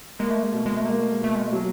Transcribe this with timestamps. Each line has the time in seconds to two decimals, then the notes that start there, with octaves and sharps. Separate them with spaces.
0.19 G#3 A#3
0.30 A3
0.43 G#3
0.52 B2 A3
0.66 G#3
0.77 A3
0.85 G#3 A#3
1.01 A3
1.12 G#3
1.19 B2 A3
1.35 G#3
1.47 A3
1.53 F#3